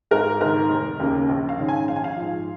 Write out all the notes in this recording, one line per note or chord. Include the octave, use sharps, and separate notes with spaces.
G#1 A#4
G#2 D#3 A#4
F1
D#2 C#3 A#3 C#4
A#1
F5
G#2 D#3 C#4
G#5
A#1 F5
G#5
F5
G#2 F3